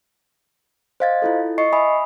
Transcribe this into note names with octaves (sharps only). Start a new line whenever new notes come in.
C5 D#5 F5 G#6 A6
E4 F4 A4
D#5 C#6 C7 C#7
E5 G#5 B5 D#6